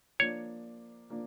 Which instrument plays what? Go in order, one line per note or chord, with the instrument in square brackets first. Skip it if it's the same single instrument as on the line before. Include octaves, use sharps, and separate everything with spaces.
[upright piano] F3 A#3 D4 [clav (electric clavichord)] C#5
[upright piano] F3 A#3 D4